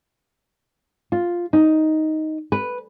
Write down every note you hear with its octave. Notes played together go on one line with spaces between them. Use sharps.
F4
D#4
B4